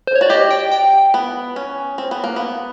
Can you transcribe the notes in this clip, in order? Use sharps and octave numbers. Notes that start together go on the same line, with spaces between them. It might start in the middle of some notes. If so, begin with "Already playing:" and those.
C5
C#5
F#4 D5
G4 D#5
G5
G5
B3
C#4
C4
B3
A#3
B3